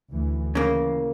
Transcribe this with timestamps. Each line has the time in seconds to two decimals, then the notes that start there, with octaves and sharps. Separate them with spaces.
0.11 D2 E3
0.55 C#3 E3 A#3